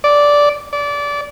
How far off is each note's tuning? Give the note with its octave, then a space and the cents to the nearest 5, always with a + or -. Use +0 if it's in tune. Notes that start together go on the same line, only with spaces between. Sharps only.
D5 -10
D5 -25